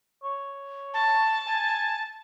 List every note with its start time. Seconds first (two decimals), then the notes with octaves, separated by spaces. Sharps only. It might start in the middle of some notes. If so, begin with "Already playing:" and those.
0.23 C#5
0.94 A5
1.47 G#5